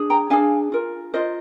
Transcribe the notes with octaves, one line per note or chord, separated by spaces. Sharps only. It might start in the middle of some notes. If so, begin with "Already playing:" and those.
Already playing: D4 G#4
G5 A#5
D4 G#4 F5 G#5
F4 A#4
F4 A#4 C5 D#5